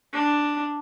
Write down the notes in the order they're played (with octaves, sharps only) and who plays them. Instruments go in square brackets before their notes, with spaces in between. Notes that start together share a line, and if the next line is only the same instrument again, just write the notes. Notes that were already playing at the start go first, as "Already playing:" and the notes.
[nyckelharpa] D4